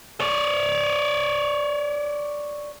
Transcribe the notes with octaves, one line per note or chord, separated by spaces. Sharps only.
C#5 D5